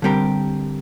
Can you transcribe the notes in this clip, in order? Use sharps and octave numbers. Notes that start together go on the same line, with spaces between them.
D3 G3 C4 G4 A#4